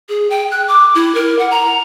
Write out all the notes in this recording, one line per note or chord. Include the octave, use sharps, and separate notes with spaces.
G#4
G5
F#6
D6
E4
A#4
F#5
A#5